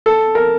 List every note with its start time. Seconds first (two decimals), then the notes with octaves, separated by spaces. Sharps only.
0.06 A4
0.35 A#4